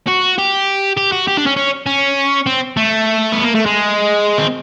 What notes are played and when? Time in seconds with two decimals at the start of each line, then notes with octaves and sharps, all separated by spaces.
0.08 F#4
0.38 G4
0.97 G4
1.12 F#4
1.27 G4
1.37 D4
1.46 C#4
1.57 C#4
1.86 C#4
2.46 C4
2.77 A3
3.32 B3
3.44 A#3
3.55 A3
3.66 G#3
4.38 C4